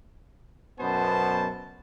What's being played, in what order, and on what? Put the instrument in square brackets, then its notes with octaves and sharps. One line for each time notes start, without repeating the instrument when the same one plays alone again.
[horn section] F#2 B2 B3 C5 A5